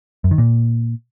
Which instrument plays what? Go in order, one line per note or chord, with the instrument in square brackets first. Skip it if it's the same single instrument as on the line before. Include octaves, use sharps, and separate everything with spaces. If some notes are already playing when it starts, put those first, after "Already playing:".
[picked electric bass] F#2
D#3
A#2